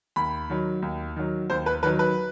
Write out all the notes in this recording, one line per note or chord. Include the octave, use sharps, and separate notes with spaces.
D#2 B5
D#3 F#3
D#2
D#3 F#3
D#2 C5
B4
D#3 F#3 B4
B4